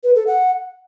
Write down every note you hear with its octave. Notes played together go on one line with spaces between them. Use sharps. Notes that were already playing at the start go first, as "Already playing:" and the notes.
B4
A4
F#5